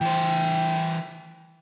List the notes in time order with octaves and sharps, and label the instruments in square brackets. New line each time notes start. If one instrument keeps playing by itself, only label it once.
[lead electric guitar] E3 C5 [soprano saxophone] G5